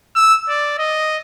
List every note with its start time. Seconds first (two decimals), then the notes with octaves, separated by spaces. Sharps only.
0.16 E6
0.49 D5
0.79 D#5